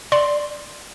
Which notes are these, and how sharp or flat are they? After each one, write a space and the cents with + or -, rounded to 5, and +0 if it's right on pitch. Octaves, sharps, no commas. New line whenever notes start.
D5 +5 C6 +0